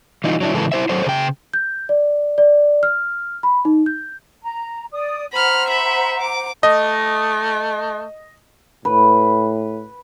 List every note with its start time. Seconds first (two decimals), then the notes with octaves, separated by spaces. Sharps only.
0.24 E3 G3 D#4 F4
0.41 F#3 D4 E4
0.54 C#3 E3 G#3 A4 B4
0.72 E4 C5 E5
0.89 F#3 A4 C5 C#5
1.06 C#3 G5
1.54 G6
1.89 D5
2.38 D5
2.83 F6
3.43 B5
3.65 D#4
3.86 G6
4.43 A#5
4.91 D5 D#6
5.32 C5 F#5 A#5 B5 F6
5.68 E5 B5
6.21 D6
6.63 A3 D#5
8.85 A2 B4